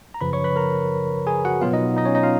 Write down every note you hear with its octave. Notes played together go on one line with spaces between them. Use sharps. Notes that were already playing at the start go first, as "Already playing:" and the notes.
A#5
F#2 C#3 F3 B4 B5
C#5 C#6
B4 B5
A#4 A#5
G#4 G#5
F#4 F#5
B2 F#3 B3 F4 F5
D#4 D#5
D#4 D#5
C#4 C#5
D#4 D#5
F4 F5